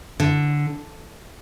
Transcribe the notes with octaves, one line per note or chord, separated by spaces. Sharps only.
D3